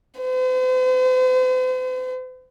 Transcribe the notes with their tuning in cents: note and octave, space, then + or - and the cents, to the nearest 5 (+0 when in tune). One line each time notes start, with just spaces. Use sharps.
C5 -45